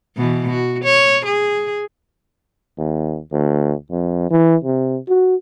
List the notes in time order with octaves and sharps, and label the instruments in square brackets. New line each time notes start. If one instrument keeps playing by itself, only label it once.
[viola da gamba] B2 E3
F#4
C#5
G#4
[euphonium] D#2
D2
F2
E3
C3
F#4